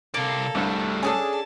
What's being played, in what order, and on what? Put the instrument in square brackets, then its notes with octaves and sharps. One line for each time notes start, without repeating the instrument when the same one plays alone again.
[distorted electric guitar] C3 D5 [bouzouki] A#3 [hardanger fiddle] A4
[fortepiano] C2 G2 [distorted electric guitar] G3 A3
[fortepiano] C#4 A4 [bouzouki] D4 G#4 G#5 [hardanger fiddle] A5